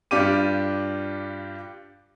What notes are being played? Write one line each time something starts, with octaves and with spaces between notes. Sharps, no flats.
G2 D4 F4 G4 D6 D#7